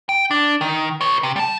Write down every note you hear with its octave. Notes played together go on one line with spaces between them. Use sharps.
G5
D4
D#3
B4 C#5
C3
G3 A5